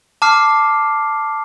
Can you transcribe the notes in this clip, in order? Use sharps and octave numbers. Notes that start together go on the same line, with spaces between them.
A5 D6 F6 C7